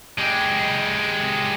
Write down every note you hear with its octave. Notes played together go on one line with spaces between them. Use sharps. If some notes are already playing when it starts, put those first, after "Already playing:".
G#3 G4